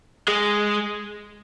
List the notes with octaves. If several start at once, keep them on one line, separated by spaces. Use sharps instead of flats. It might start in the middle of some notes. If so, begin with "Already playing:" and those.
G#3